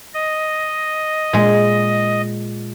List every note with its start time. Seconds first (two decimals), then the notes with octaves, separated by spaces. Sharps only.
0.14 D#5
1.33 A#2 G#3